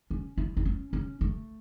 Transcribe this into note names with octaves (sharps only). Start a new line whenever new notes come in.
C#4
E4
E4
C#4
C#4
A3